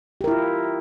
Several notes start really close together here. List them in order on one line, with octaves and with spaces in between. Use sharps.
G4 A#4 E4 F4